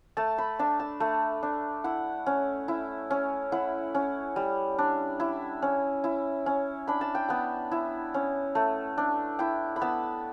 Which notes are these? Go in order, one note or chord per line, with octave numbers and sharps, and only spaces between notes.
A3 A5
B5
D4 A5
A5
A3
D4
E4 F#5
C#4
E4
C#4
E4 F#5
C#4
G3
D4
E4
C#4
E4
C#4
D4 B5
A5
G5
B3 A5
E4
C#4
A3
D4
E4 G5
B5
B3 A5